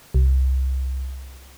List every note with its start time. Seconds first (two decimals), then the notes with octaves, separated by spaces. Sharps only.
0.14 C2